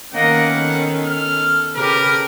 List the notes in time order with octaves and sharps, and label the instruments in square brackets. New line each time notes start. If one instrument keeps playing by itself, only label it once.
[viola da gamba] D#3 B3 C#4 [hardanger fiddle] A#3 D#5 [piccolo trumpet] F#5
[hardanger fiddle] A4
[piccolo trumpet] F6
[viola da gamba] C#3 G4 B4 [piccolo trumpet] A#4